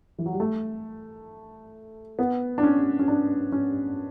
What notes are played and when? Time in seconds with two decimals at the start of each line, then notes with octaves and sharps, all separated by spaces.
0.19 E3
0.26 F#3
0.33 G3
0.40 A3
2.19 B3
2.58 D4
2.63 C#4
2.99 C#4
3.08 D4
3.52 C#4